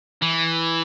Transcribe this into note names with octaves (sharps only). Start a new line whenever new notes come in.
E3